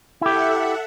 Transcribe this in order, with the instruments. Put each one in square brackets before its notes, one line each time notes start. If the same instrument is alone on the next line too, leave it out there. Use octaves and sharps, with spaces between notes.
[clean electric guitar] E4 G4 [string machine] A4 E5 F#5